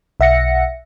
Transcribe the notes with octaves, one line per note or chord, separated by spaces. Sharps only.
B1 E5 F#5 A#6 C#7